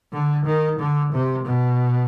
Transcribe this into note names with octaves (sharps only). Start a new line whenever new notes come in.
D3
D#3
D3
C3
B2